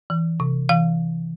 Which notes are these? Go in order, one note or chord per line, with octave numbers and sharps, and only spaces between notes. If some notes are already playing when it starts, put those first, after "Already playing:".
E3
C3
E3 F5